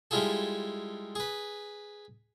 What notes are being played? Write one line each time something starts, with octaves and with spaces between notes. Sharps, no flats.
G3 G#3 E4 F4 G#4 A4
G#4 B4